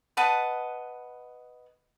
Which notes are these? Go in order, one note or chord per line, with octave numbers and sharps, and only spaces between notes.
B4 D#5 F#5 A5